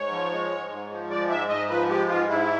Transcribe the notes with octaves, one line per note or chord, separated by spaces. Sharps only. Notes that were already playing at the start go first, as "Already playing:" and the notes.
Already playing: G#2 C#5
F3
G#3
G#2
G#2
F3
G#3 D5
G#2 E5
G#2 D#5
F3 B4
G#3 G4
G#2 F4
G#2 E4